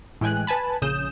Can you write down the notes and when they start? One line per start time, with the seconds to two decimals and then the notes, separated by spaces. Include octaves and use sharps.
0.21 A2 E3 G#3 G5 G#5 F#6
0.47 B4 G#5 A5 B5
0.82 A#1 C#3 D#6 G6 E7